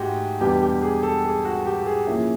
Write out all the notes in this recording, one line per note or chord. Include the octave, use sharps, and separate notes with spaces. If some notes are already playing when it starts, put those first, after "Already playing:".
Already playing: G#2 A3 F#4 G4
E2 B2 G3 B3 D4 G4
G4
G#4
A4
G#4
F#4
G4
G#4
A#2 F3 A#3 C#4 E4